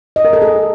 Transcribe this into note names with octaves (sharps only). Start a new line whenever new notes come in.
D#5
A#4
A4
G#4